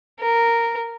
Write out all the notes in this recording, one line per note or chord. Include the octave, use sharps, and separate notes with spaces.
A#4